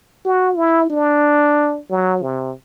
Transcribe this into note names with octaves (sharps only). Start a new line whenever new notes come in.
F#4
E4
D4
F#3
C3